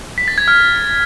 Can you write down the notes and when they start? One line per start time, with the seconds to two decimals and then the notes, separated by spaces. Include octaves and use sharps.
0.18 B6
0.28 A6
0.38 G#6
0.48 F6